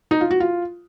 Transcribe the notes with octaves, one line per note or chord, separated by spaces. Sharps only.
D#4
F4
F#4
F4